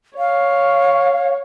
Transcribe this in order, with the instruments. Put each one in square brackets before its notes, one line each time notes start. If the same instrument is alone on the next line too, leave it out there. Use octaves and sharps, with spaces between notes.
[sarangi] C#5 [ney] F5